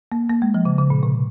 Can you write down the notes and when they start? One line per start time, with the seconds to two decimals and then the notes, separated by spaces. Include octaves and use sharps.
0.12 A#3
0.30 A#3
0.42 G#3
0.54 F3
0.65 C#3
0.78 C#3
0.90 A#2
1.03 C3